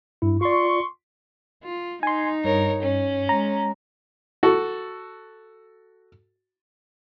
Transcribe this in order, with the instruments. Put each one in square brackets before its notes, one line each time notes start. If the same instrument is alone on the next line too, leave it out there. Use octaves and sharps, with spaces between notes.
[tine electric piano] G2 E4
[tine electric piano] F4 D5 [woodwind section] C6 C#6
[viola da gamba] F4
[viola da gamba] D#4 [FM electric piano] G#5 C6
[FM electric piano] G2 [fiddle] A#4 C#5
[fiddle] C#4
[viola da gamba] G#3 [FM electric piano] A#5
[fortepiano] F#4 A4